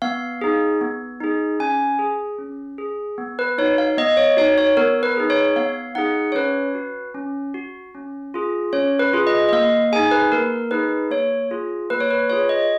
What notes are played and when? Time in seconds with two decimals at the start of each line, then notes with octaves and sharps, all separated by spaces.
0.02 B3 F5
0.41 D#4 G#4
0.81 B3
1.21 D#4 G#4
1.60 C#4 G#5
1.99 G#4
2.38 C#4
2.78 G#4
3.18 B3
3.39 B4
3.58 D#4 C#5
3.63 F#4
3.78 F5
3.98 B3 D#5
4.17 C#5
4.37 D#4 F#4 C#5
4.58 C#5
4.77 B3 A#4
5.03 B4
5.17 D#4 G#4
5.30 C#5
5.56 B3 F5
5.95 D#4 G#4 F#5
6.32 C#5
6.35 C#4 B4
6.75 F#4
7.14 C#4
7.54 F#4
7.94 C#4
8.34 F4 G#4
8.73 C#4 C#5
8.99 B4
9.13 F4 G#4
9.27 D#5
9.49 D#5
9.52 A#3 F5
9.92 G#4 G#5
9.96 D#4
10.11 B4
10.32 A#3 A#4
10.71 D#4 G#4 B4
11.10 A#3 C#5
11.51 F4 G#4
11.90 A#3 B4
12.00 C#5
12.11 B4
12.30 F4 G#4 C#5
12.49 D#5